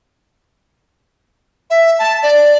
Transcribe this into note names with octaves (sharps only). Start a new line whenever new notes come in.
E5
A5
D5